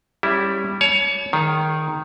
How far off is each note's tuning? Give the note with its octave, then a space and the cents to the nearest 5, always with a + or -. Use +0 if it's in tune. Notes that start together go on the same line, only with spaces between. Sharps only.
G3 +0 C#4 -15 E4 +0
C#5 +15 A5 -45
D#3 -5 G#4 +20